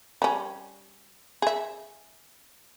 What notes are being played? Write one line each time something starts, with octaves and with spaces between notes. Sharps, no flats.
G3 C#4
G#4 E5